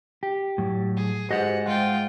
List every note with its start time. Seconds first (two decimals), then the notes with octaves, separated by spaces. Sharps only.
0.23 G4
0.58 A2 F#3
0.96 G#4
1.31 G#2 F#4 G4 B4 C5 D#5 F#5
1.66 G#3 F4 F#5 G5